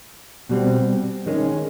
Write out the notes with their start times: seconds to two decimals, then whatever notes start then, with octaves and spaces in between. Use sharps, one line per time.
0.49 B2 G3 C4
1.26 D#3 G#3 C#4